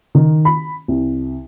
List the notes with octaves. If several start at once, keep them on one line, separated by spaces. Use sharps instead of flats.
D#3
B5
C2